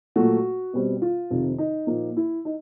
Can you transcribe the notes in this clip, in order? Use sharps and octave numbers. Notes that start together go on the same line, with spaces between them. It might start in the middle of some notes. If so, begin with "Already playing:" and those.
A#2 F#3 A3 F#4
B2 G3 C4
F4
F2 C3 D#3
D#4
A#2 F3 A#3 D#4
E4
D#4